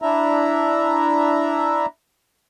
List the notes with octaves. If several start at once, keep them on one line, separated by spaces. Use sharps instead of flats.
D4 E4 E5 A#5